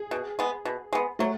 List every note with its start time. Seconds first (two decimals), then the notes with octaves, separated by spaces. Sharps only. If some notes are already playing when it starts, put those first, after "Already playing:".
Already playing: G#4
0.11 B2
0.39 G#3 B3
0.65 B2
0.93 G#3 B3
1.19 F#3 A3